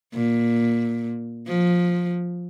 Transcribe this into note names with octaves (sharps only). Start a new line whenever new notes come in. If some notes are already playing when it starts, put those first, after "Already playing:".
A#2
F3